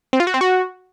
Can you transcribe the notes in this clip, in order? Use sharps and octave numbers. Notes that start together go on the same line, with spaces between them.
C4
F4
F#4
C4
F#4